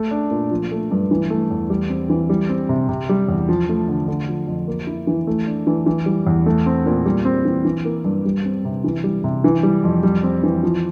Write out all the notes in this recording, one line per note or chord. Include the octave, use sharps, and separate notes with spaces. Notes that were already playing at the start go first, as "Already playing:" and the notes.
Already playing: A3
D4
A#2
F3
A3
G2
E3
A3
E2
G3
C4
E3
G3
C4
C3
C3
G3
E2
F3
A3
D3
D3
F3
F2
A#3
E4
E3
A3
D4
E3
E3
G3
E2
A3
C4
A#2
G3
C4
E3
E3
A#3
G2
G3
C4
C3
E3
G3
C3
E3
G3
F2
G3
C4
E3
F3